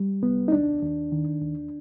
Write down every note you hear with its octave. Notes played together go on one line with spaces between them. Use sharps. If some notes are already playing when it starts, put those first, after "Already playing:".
Already playing: G3
C2 B3
D#4
D#2 D4
D#2
D#3
D#2